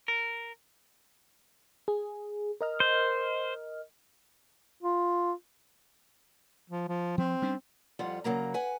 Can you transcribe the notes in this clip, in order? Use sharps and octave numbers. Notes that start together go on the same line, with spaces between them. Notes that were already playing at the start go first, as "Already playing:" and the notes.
A#4
G#4
A#4 D#5 F6
C5
F4
F3
F3
F3 C4
G3 C#4 D4
F2 G3 F4 F#5
C#3 F#3 A#3 A#5
B4 F#5 G#5